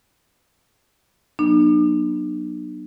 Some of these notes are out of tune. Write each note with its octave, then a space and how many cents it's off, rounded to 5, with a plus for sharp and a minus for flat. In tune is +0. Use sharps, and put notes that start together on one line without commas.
F#3 +0 B3 -30 D4 +45